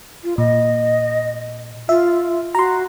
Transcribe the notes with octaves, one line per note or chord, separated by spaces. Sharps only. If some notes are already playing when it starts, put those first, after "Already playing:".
F4
A#2 D#5
F4 E5
F#4 A#5 C6